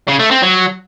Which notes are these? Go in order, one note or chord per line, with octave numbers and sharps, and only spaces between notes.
C#3
A3
C4
F#3